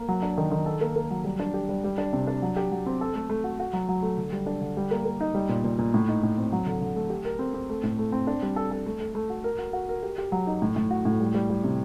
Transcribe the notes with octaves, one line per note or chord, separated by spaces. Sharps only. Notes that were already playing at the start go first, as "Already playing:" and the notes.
Already playing: A#3
F#3
D4
D#3
D#3
A4
A#3
A#3
F#3
G3
D4
G4
G3
G3
D4
C3
D4
F#3
G4
F#3
C4
A4
A3
A3
F#4
F#4
F#3
F#3
A3
D3
G3
D4
D3
G3
A#3
A#3
D#4
G3
A#2
A#2
A#2
A2
D#4
A2
C4
F#3
D3
D3
A3
G4
A#4
C4
C4
A3
A2
A3
C4
D4
G3
A4
A4
A3
A3
A3
F#4
A#4
F#4
F#4
A#4
G4
G4
F#3
D#4
A2
A2
F#4
A2
G3
G3
G3
C3